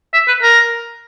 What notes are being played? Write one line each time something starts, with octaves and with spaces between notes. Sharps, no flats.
E5
B4
A#4